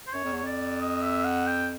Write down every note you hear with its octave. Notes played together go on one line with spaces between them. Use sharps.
C5
F#2 C#5
F2
E2 C#5
F2 D5
D#5
E5
F#5
G5